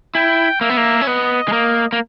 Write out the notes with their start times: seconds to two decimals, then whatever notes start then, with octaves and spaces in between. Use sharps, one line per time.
0.15 E4 G5
0.61 A#3 E5
0.70 B3
0.77 A#3
1.01 C#4
1.07 B3 D#5
1.48 G#3
1.53 A#3
1.93 A#3